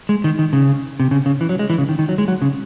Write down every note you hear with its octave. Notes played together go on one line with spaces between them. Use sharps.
G#3
D#3
D#3
C#3
C3
C#3
C#3
E3
F#3
G#3
E3
C#3
D#3
D#3
F#3
G#3
F#3
C#3